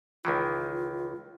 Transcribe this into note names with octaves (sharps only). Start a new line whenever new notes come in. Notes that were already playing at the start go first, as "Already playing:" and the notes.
C#2 D#3 E3 F4